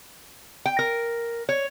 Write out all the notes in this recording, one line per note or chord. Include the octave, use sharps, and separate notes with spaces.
G5
A#4
C#5